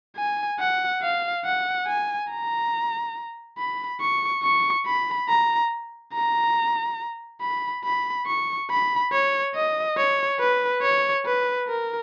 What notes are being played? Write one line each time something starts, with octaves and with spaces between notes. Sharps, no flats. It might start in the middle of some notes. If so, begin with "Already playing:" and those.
G#5
F#5
F5
F#5
G#5
A#5
B5
C#6
C#6
B5
A#5
A#5
B5
B5
C#6
B5
C#5
D#5
C#5
B4
C#5
B4
A#4